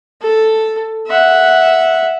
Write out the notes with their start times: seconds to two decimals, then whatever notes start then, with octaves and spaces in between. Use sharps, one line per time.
0.21 A4
1.07 E5 F#5